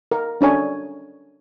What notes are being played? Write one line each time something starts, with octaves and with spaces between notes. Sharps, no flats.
A#4
C#4 D4 C#5 G#5